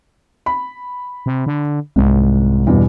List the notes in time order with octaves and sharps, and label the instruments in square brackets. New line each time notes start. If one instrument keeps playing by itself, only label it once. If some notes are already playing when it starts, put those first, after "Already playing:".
[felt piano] B5
[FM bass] C3
D3
[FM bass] C2 [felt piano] G#2
[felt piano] E2 G2 B2